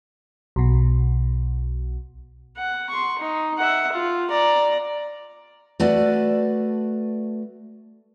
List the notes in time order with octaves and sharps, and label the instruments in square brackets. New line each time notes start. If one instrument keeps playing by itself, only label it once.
[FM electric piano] B1 B2
[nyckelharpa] F#5
C6 C#6
D#4
E5 F#5
F4
D5 A#5
[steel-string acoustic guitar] A3 F#4 B4 D5 A5